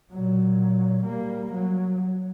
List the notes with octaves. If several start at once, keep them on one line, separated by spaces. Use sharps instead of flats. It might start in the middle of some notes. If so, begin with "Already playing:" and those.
A#2 F#3
G3 A#3
F#3